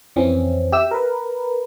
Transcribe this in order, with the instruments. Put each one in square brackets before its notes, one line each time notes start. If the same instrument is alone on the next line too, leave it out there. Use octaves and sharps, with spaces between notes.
[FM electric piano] F2 E3 C4 C#4
G4 E5 E6
A#4 B4